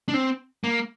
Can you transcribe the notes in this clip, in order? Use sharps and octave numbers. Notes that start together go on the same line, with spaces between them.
D4
C4
A#3